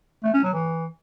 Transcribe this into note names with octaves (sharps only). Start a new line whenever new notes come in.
A3
C#4
F#3
E3